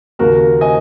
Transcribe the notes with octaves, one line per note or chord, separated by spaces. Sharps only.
D#2 C#3 A#3 F#4 A#4
D#5 G#5